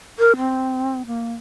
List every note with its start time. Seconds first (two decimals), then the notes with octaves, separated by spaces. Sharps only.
0.19 A#4
0.37 C4
1.07 A#3